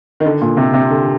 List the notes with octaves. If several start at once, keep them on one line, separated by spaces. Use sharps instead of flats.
D#3
D3
A#2
C3
C3
D3